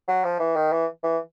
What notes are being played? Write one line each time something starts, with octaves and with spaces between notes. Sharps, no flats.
F#3
F3
E3
D#3
E3
E3